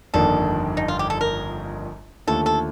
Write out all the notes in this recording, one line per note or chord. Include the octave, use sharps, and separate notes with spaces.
G1 F2 D#3 A#3 D4 A4
D#4
F4
G4
A4
A#4
D#2 D3 F3 A3 A4
A4